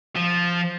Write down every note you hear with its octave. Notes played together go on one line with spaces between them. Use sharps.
F3